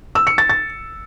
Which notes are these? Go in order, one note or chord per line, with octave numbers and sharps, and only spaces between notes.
E6
C#7
A6
A6